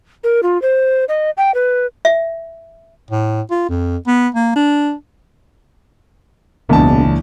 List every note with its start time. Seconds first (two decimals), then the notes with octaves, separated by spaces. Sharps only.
0.24 A#4
0.43 F4
0.62 C5
1.09 D#5
1.37 G5
1.54 B4
2.05 E5
3.11 A2
3.50 F4
3.69 F2
4.07 B3
4.35 A#3
4.56 D4
6.69 E1 C#2 A#2 E3 D4 A5